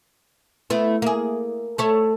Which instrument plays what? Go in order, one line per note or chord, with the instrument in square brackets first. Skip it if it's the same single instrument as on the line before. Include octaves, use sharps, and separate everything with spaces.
[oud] A3 B3 E4
A#3 G#4
A3 A4 C#5